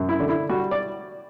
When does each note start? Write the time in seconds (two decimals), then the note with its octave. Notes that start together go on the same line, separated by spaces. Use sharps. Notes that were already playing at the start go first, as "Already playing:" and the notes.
Already playing: F#2
0.09 E4
0.20 D3
0.29 E4
0.49 G3 F#4
0.71 D5